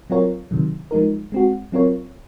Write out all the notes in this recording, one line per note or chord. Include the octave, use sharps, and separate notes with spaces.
F#3 C4 F4 A#4 C#5
C3 D#3 F#3
F3 G#3 D#4 A#4
G#3 C4 F#4
F#3 C4 F4 A#4 C#5